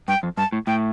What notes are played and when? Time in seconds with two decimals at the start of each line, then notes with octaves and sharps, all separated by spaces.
0.08 G2 G5
0.23 F2
0.37 G2 A5
0.52 A2
0.67 A2 G5